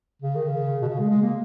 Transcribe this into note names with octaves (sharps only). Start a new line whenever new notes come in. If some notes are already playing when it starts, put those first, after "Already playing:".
C#3
D#3
C#3
B2
C#3
G#3
G#3
A#3